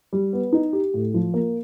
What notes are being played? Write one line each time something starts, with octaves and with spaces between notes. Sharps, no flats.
G3
B3
D#4
G4
A2
F3
A#3